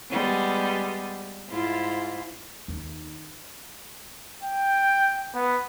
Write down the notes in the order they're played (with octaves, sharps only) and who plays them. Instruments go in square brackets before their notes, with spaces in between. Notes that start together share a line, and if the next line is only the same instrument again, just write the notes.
[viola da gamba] G3 G#3 B3
G#2 E4 F4
[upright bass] D#2 D#4
[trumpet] G5
B3